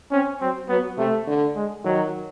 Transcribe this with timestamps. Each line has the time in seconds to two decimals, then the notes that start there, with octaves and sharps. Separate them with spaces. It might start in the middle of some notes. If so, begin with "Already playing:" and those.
0.12 C4 C#4
0.41 F#3 C4
0.69 F#3 B3
0.98 C3 A3
1.27 D3
1.56 G#3
1.84 D#3 F#3